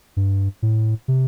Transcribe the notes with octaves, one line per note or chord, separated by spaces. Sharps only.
G2
A2
C3